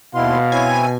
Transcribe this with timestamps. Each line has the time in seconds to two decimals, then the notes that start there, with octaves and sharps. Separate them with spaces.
0.15 D#2 B2 E4 F5 C6
0.52 C4 E4 C#5 G#5